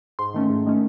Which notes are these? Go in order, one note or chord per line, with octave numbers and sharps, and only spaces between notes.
G#2 C6
D#3 A3 C#4
G#2
D#3 A3 C#4